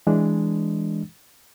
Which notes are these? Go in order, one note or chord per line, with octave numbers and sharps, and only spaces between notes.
E3 G#3 D4